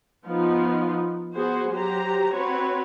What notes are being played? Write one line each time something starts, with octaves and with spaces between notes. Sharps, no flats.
F3 B3 D#4 F4
B3 F#4 G#4 C5
F#3 G4 C5 A#5
C4 F#4 B4 C#5